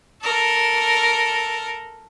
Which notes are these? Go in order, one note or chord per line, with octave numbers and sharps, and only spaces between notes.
A4 A#4